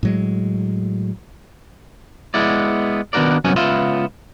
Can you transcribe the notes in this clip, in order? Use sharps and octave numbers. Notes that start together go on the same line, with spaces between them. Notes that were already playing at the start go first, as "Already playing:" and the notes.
A2 F#3 G#3
G#3 B3 E4 D5
D#3 B3 D4 F#4 A#4 D5
C2 F#2 F#3 B3 C#4 G#5
C#2 B3 F4 B4 E5 C6